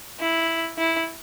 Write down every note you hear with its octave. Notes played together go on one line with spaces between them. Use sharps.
E4
E4